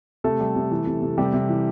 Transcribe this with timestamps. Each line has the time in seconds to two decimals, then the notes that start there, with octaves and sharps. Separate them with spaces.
0.24 C3 A3 A4
0.40 G3
0.56 C3
0.71 E3
0.87 C3
1.02 C3
1.18 C3 G3 G4
1.33 C3
1.49 E3